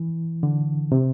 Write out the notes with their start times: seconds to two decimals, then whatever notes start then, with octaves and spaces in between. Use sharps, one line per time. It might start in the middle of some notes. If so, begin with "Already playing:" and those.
Already playing: E3
0.43 D3
0.92 C3